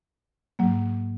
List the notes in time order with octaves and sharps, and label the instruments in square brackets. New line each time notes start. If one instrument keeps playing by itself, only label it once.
[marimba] G#2 F#3 A#3